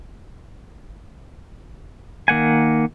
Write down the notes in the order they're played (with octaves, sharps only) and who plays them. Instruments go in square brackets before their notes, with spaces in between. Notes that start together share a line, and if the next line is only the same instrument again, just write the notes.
[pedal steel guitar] D#3 A#3 F#5 G#5